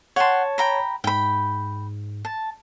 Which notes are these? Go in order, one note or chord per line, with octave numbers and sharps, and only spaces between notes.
C#5 F#5 G5 A5 C6
G5 A#5 B5
G#2 G5 B5
A5